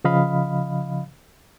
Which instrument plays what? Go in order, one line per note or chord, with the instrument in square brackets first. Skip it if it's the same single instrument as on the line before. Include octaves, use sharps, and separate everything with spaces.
[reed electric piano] C#3 F3 D#5 F5 B5